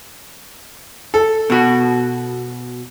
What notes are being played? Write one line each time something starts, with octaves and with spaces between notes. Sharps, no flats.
A4
B2 F#4